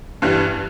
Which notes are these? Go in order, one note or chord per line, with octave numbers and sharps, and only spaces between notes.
G2 E3 G3